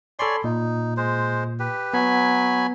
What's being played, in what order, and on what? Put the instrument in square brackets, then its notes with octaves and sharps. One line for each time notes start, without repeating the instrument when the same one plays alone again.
[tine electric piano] A4 B5 C6 [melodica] C#5 D5 G#5
[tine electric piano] A#2 [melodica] D#4
[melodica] G#3 C5
G4 B4
[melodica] F#3 G#5 B5 [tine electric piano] B3